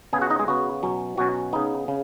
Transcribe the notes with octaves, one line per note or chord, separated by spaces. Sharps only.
C#3 B3 G#4 G#5
F#4 F#5
D#4 D#5
G#3 G#4
C#3 B3 F#4
B2 F#3 C#4
B2 F#3 C#4 F#4
C#3 B3 D#4
C#3